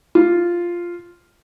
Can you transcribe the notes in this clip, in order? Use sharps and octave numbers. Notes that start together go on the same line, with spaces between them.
F4